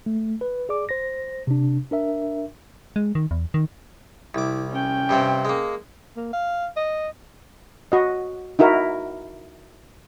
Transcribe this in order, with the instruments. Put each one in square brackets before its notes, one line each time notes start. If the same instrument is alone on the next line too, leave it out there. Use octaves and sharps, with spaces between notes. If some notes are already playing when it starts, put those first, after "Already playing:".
[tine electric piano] A3
B4
G#4 D5 D6
C5 A#6
C3 D4
D4 A#4 E5
[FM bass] G#3
D#3
E2
D#3
[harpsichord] C2 D6 [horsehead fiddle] E4
[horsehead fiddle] C#4 G5
[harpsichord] G2 C3 C4
G#3 A#3
[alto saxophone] A#3
F5
D#5
[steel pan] F#4 D#5
D#4 E4 F#4 A#4